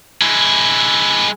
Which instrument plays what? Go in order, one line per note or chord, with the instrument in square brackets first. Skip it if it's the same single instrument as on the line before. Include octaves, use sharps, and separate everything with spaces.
[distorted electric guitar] G#3 E4